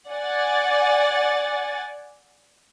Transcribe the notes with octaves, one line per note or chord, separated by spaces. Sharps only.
D5 F#5 G#5 A6